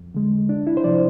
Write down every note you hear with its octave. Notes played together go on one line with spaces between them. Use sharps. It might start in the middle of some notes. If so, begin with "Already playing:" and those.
Already playing: F2
D3 G#3
C2 D4
E4
C5
C3 F3 D5